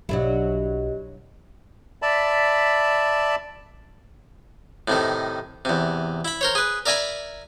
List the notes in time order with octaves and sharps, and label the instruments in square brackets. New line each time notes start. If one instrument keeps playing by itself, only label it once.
[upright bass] B1 [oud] F#3 D4 E4 [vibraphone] G4 D#5
[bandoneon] D5 E5 A5 B5
[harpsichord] A2 C3 D#3
E2 C3
E4 B5
A#4 C5 C#5
G#4 B4
A#4 D5 E5 G#5 A#5 B5